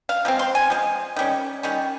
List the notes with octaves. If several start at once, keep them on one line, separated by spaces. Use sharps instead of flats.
F5
F3 G#3 C4
C6
G#5
F3 G#3
D#3 G3 C#4
D#3 G3 C#4